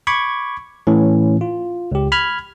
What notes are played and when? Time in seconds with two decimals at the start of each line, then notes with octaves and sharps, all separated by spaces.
0.07 B5 C#6 D6 G#6
0.87 A2 E3 C#4
1.41 F4
1.92 C#2 G4
2.12 B5 F6 G#6